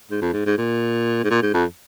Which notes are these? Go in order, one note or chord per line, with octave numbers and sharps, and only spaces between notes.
G#2
F2
G#2
G#2
A#2
G#2
A#2
G#2
F2